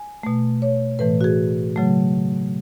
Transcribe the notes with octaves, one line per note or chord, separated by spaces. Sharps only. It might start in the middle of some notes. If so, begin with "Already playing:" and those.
Already playing: G#5
B2 A3
C#5
A2 E3 A3 B4
F#4
G#4
C#3 F#3 A3